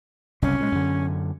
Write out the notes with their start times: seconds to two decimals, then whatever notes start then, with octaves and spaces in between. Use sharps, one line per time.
0.42 F#1 C2 C3 C#4
0.59 A#2 F#3 G#3
0.72 F#2 D3